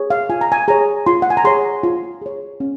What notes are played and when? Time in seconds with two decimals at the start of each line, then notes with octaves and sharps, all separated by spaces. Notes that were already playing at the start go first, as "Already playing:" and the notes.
Already playing: G#4 C#5
0.10 F5
0.30 F4 G#5
0.41 A#5
0.52 G#5
0.68 G#4 C#5 A#5
1.06 F4 C6
1.22 F#5
1.30 G#5
1.37 A#5
1.44 G#4 C#5 C6
1.83 F4
2.22 G#4 C#5
2.60 C#4